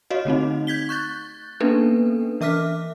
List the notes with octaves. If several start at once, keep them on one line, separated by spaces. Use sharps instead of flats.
F#4 C#5 D#5 F5
D3 A3 C4 D#4
G6 G#6 B6 G7
C#6 F#6 G6 A6
A#3 B3 C#4 D4 A4 B4
E3 E5 D6 F6 B6